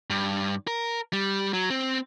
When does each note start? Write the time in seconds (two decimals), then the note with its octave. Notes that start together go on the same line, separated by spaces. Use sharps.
0.10 G2
0.67 A#4
1.13 G3
1.53 F#3
1.70 C4